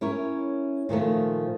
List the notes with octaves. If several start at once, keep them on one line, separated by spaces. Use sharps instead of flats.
C#4 E4 A#4 C#5
A#2 D#3 F3 A3